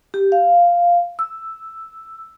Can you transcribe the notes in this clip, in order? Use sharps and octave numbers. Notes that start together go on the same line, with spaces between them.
G4
F5
E6